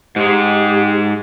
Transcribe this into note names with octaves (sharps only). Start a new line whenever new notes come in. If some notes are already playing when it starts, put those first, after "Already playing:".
G#2 G#3 G4